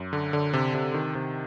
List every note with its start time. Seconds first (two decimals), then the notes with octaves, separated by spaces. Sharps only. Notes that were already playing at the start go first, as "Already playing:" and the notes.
Already playing: F#2
0.13 D3
0.33 D3
0.53 C3
0.75 C3
0.94 D#3
1.15 C3